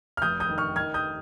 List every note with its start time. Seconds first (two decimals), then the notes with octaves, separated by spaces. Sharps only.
0.17 F6
0.22 F1 D#6 G6
0.40 D#6 G6
0.49 D#3
0.58 C#6 F6
0.76 D#3 F6 G#6
0.94 D#6 G6